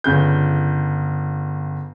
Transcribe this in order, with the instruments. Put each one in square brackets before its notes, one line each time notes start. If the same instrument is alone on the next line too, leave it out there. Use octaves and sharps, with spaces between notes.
[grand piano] G1 C#3 G6